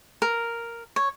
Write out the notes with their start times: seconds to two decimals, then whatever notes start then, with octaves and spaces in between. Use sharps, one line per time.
0.22 A#4
0.96 C#5